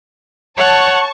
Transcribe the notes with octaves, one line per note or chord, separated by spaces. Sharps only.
C#5 F#5 A5 C#6